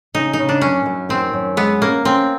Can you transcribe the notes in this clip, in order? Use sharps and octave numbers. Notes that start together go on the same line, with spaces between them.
C#3 D#4
D#4
C#3
D4
F#2 C#4
F#2
D#3 C4
F#2
G#3 B3
A#3 C#4
C4 C#4